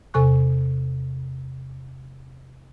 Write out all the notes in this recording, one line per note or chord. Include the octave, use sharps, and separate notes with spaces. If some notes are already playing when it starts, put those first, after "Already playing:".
E2 C3 A4 G#5 C#6 F#6